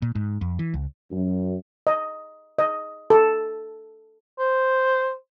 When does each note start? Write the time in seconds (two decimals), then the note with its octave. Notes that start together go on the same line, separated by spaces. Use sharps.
0.02 A#2
0.15 G#2
0.41 F2
0.59 E3
0.74 C#2
1.11 F#2
1.87 D#5
2.59 D#5
3.10 A4
4.39 C5